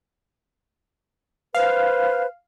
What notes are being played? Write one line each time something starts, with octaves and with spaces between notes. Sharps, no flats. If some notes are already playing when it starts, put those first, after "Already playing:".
B4 C5 F5